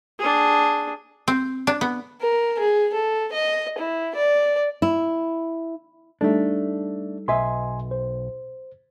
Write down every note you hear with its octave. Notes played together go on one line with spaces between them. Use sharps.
D4 G#4
C4
D4
B3
A#4
G#4
A4
D#5
E4
D5
E4
G3 A3 D4 D#4 A4
B1 B4 D#5 E5 G#5 C6
C5